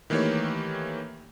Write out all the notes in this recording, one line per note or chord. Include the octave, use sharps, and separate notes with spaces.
D#3 E3 A3 A#3 G4 C#5